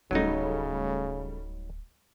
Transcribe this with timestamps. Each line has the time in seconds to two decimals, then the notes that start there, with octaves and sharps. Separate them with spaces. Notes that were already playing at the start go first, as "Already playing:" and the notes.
0.11 D1 C#3 F#3 G3 A3 C#4 D#4